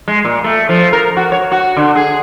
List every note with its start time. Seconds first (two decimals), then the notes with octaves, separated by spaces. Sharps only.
0.08 G#3
0.25 A#2
0.44 A3
0.69 F3
0.93 A#4
1.17 F#4
1.32 C#5
1.52 F#4
1.77 D3
1.96 G#4